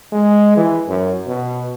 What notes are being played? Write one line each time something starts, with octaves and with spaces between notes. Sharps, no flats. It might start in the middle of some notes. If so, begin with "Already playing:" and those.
G#3
E3
F#2
B2